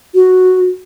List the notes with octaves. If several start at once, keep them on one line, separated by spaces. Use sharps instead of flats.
F#4